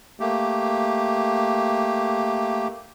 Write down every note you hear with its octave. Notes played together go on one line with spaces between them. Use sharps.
A3 A#3 G4